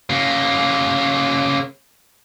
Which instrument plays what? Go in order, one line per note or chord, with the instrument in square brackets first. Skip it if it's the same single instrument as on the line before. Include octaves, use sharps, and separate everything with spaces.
[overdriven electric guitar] C#3 A#3